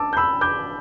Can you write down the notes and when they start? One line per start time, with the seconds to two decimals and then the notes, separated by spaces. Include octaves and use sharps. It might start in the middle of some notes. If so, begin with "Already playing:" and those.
Already playing: A5 D6 E6
0.13 G6
0.17 B5 E6
0.41 D6 G6